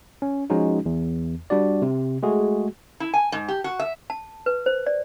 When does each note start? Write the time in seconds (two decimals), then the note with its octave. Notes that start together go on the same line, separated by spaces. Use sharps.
0.22 C#4
0.50 F3 G#3 C#4 D#4 F#4
0.86 E2
1.50 G3 D4 F#4 D5
1.82 C3
2.23 G#3 A3 F#4 G#4
3.00 E4
3.14 G#5
3.32 G#2
3.48 G4
3.64 F#4
3.79 E5
4.10 A5
4.46 B4
4.66 C5
4.86 D5